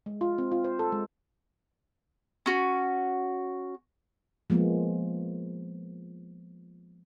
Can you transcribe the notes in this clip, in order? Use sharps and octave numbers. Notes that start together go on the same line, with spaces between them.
G#3
F4
C4
F4
C5
A4
G#3
C#4 F#4
F3 G#3 A#3 B3